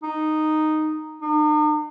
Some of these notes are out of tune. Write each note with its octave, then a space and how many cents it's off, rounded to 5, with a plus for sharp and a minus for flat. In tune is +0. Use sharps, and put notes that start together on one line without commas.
D#4 -5
D#4 -45